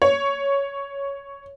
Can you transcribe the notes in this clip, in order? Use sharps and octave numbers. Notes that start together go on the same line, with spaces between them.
C#5